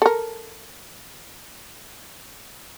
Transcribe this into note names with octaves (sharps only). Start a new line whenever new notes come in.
A4 A#4